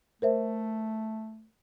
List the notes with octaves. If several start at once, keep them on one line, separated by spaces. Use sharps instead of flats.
A3 A#4 C5 E5